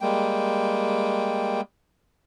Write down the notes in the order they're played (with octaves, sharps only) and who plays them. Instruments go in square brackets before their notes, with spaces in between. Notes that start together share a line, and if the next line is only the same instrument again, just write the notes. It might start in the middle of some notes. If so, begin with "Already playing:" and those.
[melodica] G3 G#3 A#3 G5